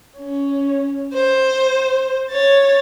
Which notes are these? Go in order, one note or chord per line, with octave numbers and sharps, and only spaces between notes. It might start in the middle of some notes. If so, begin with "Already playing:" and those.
C#4
C5
C#5 A6